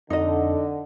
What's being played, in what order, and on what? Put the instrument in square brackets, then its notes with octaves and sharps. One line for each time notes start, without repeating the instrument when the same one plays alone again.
[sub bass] F2 [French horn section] D3 [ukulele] D#4 D#5